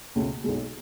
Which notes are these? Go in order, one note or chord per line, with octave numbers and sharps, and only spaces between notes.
C#2 B2 A3 C#4
B1 B2 G#3